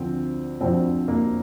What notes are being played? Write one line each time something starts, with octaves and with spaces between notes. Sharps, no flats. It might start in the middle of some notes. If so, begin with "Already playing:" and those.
Already playing: D2 D3 F3 C4
D2 D3 F3 C4
A#3